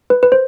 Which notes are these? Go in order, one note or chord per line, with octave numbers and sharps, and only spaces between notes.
B4
B4
C5